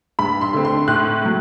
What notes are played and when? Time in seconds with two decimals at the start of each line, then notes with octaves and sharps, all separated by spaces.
0.19 G2 B5
0.41 C6
0.54 D3 A3 C4
0.65 C6
0.88 A2 F#6
1.22 F#3 A3